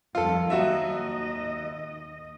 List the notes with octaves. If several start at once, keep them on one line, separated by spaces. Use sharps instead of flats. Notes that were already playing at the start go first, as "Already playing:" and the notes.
F2 D#3 G3 F4 A4
D#2 F#3 F#4 D#5 E5